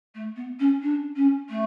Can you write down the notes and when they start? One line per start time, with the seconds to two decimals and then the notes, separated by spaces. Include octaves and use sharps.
0.14 A3
0.36 B3
0.59 C#4
0.82 D4
1.16 C#4
1.49 A3